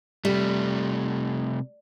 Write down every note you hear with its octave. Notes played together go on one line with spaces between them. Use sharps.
C3 G3 A3